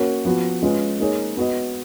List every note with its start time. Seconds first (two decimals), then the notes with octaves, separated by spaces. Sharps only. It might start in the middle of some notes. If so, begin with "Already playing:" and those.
Already playing: A#3 C#4 F#4 C#5
0.25 F3 B3 F#4
0.63 G#3 C#4 F4 B4
1.00 A#3 D#4 G#4 C#5
1.37 B3 F#4 B4 D#5